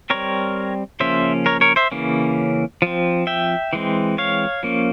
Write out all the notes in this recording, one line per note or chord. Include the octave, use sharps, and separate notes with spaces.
G3 C4 A#4 C#5
C#3 F3 A#3 C#4 C5 E5
A#4 C#5
A#4 C#5
C5 E5
C#3 E3 A#3 C#4
F3 C4
E5 G5
E3 G#3 C4
C#5 F5
F3 A#3 C#4